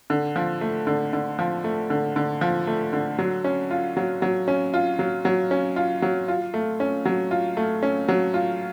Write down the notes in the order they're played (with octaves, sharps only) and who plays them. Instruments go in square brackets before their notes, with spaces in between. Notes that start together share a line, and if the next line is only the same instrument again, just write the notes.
[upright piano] D3
F3
A3
D3
D3
F3
A3
D3
D3
F3
A3
D3
F#3
C#4
F4
F#3
F#3
C#4
F4
F#3
F#3
C#4
F4
F#3
F4
A3
C#4
F#3
F4
A3
C#4
F#3
F4